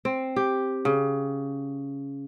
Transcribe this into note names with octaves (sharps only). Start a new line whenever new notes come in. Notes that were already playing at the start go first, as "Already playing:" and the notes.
C4
G4
C#3